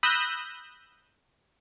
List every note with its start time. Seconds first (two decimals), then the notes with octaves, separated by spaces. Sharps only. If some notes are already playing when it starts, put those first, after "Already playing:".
0.03 B5 D#6 E6 F#6 G6 A#6